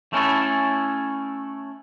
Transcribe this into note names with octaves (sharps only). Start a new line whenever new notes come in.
A3 C#4 E4 A4